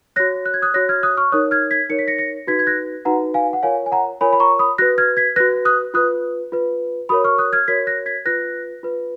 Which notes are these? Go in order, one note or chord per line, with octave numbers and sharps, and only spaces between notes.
F#4 C#5 F#6 A#6
F#6
G#6
D#6 F#6
F#4 C#5 F#6 A#6
F6 G#6
D#6 F#6
C#6 F6
D#4 A#4 C#5 D#6 F#6
F6 G#6
G#6 B6
D#4 A#4 C#5 C#7
B6
A#6 C#7
A#6 C#7
D#4 F#4 B4 G#6 B6
G#6
F#6 A#6
D#4 F#4 B4 F#5 A#5
F5 G#5
F#5
F4 A#4 C#5 F5 G#5
G#5
F#5 A#5
F4 A#4 C#5 G#5 B5
B5
A#5 C#6
B5 D#6
F#4 B4 F#6 A#6
F6 G#6
G#6 B6
F#4 B4 F#6 A#6
D#6 F#6
F4 B4 D#6 F#6
F4 B4
F#4 A#4 C#5 B5 D#6
C#6 F6
D#6 F#6
F6 G#6
F#4 A#4 C#5 G#6 B6
F#6 A#6
G#6 B6
F4 B4 F#6 A#6
F4 B4